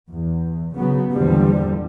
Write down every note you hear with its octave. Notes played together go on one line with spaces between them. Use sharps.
E2
C#3 F#3 B3
E2 A#2 D3 E3 F3 G3